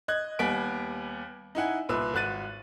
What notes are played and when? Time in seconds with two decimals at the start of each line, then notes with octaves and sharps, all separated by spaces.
0.08 D#5 F#6 G#6
0.39 D#2 G3 B3 G#5 B6 D7
1.55 D#4 E4 F#5 G#5
1.89 C2 A#2 B4 E6
2.14 G#1 F#4 F#6 A6 D#7